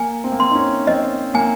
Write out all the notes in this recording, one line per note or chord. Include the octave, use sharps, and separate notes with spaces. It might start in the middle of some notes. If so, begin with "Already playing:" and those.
Already playing: A#3 G#5
C4
A#3
C4 C6
D#4
C#4
C4 D#5
A#3 G#5